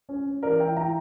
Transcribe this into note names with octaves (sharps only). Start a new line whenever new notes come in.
C#4
C#4
E3 A#4 D5
E3 E5 G5
E4 G5 A#5